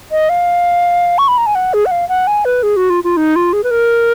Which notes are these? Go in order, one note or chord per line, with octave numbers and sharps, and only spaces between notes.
D#5
F5
C#6
B5
A#5
G#5
F#5
G#4
F#5
F5
F#5
G#5
B4
G#4
F#4
F4
F4
D#4
F4
G#4
B4
A#4